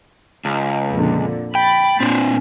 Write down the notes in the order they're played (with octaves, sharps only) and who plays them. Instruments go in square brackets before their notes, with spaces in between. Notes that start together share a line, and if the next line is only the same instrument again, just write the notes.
[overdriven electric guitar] C#2
[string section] F2 A#2 D3
[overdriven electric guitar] G5 [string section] B5 A6
[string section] A#2 [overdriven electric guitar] C4 D4